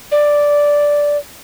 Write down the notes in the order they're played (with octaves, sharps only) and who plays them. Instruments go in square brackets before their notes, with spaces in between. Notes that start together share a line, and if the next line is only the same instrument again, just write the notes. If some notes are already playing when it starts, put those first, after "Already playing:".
[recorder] D5